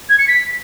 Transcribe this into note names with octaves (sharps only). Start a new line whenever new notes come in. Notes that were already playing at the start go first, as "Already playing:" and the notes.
G#6
C#7
B6